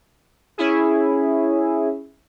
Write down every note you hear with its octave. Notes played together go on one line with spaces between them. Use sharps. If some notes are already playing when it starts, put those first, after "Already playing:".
C#4 E4 G#4